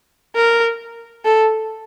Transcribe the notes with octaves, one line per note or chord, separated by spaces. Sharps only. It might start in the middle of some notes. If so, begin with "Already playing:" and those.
A#4
A4